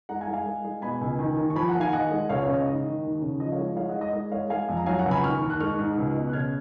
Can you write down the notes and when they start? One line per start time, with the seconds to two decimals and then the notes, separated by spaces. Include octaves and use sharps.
0.09 G#3 F#5 A#5
0.21 F5 G#5
0.28 G#3
0.33 F5 G#5
0.46 G#3
0.65 G#3
0.82 B2 G#5 B5
1.01 C#2
1.19 D#3
1.37 D#2
1.50 C#6
1.56 F3 G#5 B5
1.68 F#5 A#5
1.74 D#2
1.80 F5 G#5
1.93 D#2 D#5 F#5
2.11 G#3
2.29 C#2 C#5 F5
2.42 C#5 F5
2.48 C#3
2.54 D#5
2.66 G#2 D#5
2.85 D#3
3.03 D#2
3.22 C#3
3.40 F3 D#5
3.52 C#5 F5
3.58 G#3
3.76 G#3 C#5 F5
3.89 D#5 F#5
3.96 G#3
4.01 D#5
4.13 G#3 D#5
4.31 G#3 C#5 F5
4.50 G#3 F5 G#5
4.69 F2
4.77 A#5
4.86 F#3 F5 G#5
4.99 F#5 A#5
5.06 C#2
5.11 G#5 B5
5.23 D#2 C#6 F6
5.41 D#2
5.50 F#6
5.60 G#3 C#6 F6
5.79 G#2
5.97 C#2
6.16 B2
6.29 F#6
6.33 C#3 F6 G#6